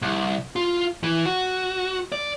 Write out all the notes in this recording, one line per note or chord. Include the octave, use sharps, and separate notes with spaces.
C2
F4
E3
F#4
D5